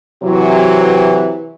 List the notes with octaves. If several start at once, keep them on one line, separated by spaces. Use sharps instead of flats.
C3 E3 F#3